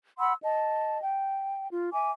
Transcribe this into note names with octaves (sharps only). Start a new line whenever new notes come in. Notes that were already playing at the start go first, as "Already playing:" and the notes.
F#5 B5 C6 E6
D#5 A5
G5
F4
E5 G#5 D6